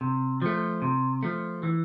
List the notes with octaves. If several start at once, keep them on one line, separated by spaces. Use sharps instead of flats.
C3
F3 A3
C3
F3 A3
E3